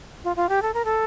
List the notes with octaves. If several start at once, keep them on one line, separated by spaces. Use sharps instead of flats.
F4
F4
G4
A4
A#4
A4